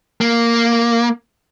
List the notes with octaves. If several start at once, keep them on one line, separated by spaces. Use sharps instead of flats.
A#3